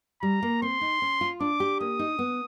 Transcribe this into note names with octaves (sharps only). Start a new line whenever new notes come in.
G3 A#5
A#3
C4 C6
D#4
C#4
F4
D4 D6
G4
A#3 D#6
D#4
B3